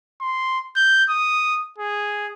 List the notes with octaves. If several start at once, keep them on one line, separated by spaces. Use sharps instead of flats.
C6
G6
D#6
G#4